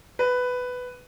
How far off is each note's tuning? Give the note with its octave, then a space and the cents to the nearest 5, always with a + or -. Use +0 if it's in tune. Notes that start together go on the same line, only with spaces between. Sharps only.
B4 +10